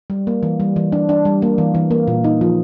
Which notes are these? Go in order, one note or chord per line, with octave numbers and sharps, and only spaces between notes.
G3
A#3
E3
G3
E3
D4
D4
G3
A#3
E3
E3
A#3
A#2
D#4
F3